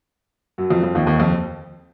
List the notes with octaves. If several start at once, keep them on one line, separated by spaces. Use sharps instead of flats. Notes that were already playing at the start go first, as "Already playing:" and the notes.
F#2 F#3
F2 F3
F2 F3
D#2 D#3
D#2 D#3
F2 F3